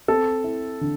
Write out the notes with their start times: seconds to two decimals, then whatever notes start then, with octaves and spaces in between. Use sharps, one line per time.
0.08 C4 A4
0.44 E4
0.81 D3